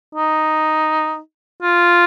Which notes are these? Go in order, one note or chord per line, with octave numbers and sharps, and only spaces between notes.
D#4
F4